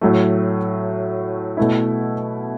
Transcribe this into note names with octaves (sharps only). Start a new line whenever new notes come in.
A2 F#3 A3
B2 A3 E4